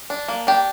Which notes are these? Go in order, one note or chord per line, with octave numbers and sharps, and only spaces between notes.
D4
A#3
D4 G4